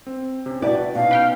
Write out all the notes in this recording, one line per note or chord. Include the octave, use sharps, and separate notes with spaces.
C4
C3 C#4
E4 F#4 B4 D5 G5 A5
B2 C#4 D#4 F5
B4 G5 F6